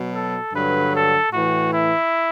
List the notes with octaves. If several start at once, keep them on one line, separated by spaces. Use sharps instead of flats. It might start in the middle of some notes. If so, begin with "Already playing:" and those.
Already playing: B2 F#3
A4
G2 D3 F#3 B4
A4
A2 E3 F#4
E4